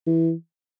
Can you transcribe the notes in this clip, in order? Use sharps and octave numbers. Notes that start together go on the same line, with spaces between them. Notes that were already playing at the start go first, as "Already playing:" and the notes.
E3